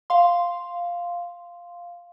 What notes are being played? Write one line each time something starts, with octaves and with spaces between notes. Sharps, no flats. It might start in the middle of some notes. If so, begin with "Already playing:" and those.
F5 C6